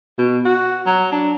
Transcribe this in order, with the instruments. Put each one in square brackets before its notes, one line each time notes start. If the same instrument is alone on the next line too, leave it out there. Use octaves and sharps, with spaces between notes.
[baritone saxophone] B2
F#4
F#3
D4